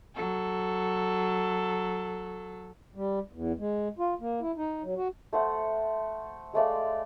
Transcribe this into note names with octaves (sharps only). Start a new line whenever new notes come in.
F#3 A4
G3
E2
G#3
F4
A#3
E4
D#4
F#3
F#4
A3 C5 F#5
G#3 A3 D5 F5